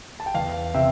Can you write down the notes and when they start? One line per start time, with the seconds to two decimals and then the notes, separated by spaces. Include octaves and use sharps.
0.20 A5
0.26 G5
0.35 E2 F5
0.74 C3 E5 G5